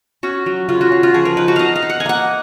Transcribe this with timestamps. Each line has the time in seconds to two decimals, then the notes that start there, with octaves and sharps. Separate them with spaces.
0.23 C#4 F#4
0.46 F#3
0.69 C#3 F4
0.81 F#4
0.92 C#3
1.03 F4
1.14 F3 G#4
1.25 A#4
1.37 D#4 B4
1.48 F#4
1.56 D#4 D#5 F5
1.76 F5
1.82 D#4
1.90 F#5
2.00 G#5
2.06 A#3 F#5